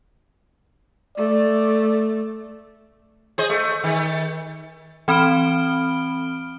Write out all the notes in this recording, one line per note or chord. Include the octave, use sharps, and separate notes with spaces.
A3 D5
G#4 C5 D#5
A3
D#3
E3 C4 B5 F6 D7 G7